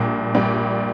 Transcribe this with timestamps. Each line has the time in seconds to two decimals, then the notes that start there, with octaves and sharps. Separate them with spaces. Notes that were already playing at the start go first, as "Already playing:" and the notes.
Already playing: A#1 A#2 G3
0.35 A#1 A#2 G3